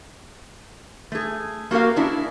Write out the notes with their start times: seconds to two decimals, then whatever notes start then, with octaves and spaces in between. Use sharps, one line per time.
1.12 A3 G#4
1.71 A#3 F#4 G4 A#4 F5
1.96 C#4 D4 E4 G#4 A#4